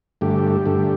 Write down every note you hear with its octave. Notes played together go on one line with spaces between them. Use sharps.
G2 D3 A3 G4
G2 D3 A3